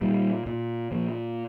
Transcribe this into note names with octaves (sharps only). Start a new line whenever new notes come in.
A#2 G3
A#2
A#2 F3